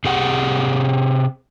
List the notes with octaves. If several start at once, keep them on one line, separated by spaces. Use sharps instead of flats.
C3 G4 G#4 F#5